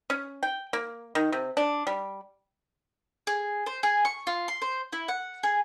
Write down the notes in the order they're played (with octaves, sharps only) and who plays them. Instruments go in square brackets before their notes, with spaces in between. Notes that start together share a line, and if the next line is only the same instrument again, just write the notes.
[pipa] C#4
G5
A#3
D#3
C3
D4
G3
[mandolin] G#4
C5
G#4
C#6
F4
C6
C5
E4
F#5
G#4